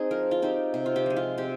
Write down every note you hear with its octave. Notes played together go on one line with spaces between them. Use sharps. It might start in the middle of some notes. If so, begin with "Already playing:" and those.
Already playing: C4 D#4 G#4
F3 A#4
F4
C4 D#4 G4
C3
F4
G4
F3 G#3
F4
C3 G4